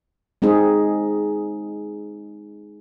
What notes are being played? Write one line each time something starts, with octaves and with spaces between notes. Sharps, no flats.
G#3 C4 D#4 G#4